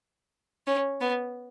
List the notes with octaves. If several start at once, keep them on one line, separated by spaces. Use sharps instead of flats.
C#4
B3